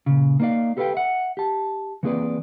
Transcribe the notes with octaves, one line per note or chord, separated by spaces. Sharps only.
A#2 C#3
A#3 D#4 B4 D5 F5
G4 A4 B4 C#5 F5 G5
E5 F#5
G4 A5
E3 A#3 C4 G#4 B4 D5